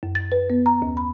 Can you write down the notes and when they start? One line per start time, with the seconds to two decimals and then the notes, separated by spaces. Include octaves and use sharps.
0.03 F#2
0.15 A6
0.32 B4
0.50 B3
0.66 A#5
0.82 D#2
0.97 B5